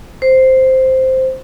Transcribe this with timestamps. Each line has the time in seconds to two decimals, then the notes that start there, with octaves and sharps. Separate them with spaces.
0.22 C5